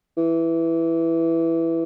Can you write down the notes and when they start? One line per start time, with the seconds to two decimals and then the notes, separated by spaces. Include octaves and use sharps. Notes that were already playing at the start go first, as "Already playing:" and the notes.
0.17 E3